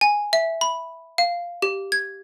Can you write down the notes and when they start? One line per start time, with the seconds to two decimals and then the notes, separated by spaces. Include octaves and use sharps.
0.01 G#5
0.33 E5
0.61 B5
1.18 F5
1.62 G4
1.92 G#6